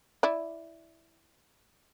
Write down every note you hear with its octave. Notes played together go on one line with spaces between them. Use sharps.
E4 D5